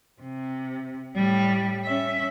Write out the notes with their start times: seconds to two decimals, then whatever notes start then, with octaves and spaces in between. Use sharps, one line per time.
0.22 C3
1.15 A2 G3
1.85 C#4 E5